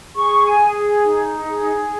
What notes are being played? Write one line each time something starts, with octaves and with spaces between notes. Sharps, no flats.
G#4 C#6
G#5
G#4
D#4
G#4